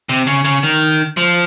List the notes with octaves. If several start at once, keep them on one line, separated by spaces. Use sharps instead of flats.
C3
C#3
C#3
D#3
F3